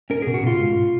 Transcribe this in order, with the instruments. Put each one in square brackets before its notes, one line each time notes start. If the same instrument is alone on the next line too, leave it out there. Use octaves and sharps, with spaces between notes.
[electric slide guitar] C#4 A#4
B2 G#4
F#4
B2 F4
G#2